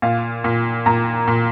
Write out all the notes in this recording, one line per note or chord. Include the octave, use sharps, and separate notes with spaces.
A#2 F5
A#2
A#2 A#5
A#2